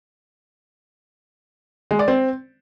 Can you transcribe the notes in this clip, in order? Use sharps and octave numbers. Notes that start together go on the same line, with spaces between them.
G#3
D5
C4